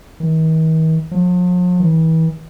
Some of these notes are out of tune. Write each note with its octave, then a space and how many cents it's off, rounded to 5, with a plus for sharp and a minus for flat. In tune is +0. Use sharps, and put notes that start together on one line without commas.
D#3 +45
F3 +45
E3 -35